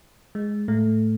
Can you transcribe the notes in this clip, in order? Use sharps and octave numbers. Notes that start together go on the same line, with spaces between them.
G#3
A2 A3